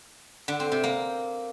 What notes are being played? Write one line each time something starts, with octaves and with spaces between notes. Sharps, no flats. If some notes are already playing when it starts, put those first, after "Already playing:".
D3
C4
C3
A#3